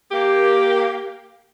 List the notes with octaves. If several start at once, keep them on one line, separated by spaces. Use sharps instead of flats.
A#3 G4